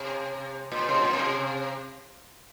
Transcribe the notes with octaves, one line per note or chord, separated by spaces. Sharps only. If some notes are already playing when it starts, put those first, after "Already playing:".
Already playing: C3
A#2
C3
A#2
C3